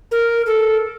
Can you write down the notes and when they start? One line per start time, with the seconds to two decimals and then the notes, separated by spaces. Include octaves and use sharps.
0.11 A#4
0.46 A4